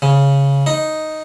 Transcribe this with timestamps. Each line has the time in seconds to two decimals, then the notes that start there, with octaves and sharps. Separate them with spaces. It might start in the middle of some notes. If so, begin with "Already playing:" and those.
0.02 C#3
0.67 D#4